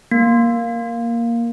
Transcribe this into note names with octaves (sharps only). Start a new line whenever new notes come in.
A#3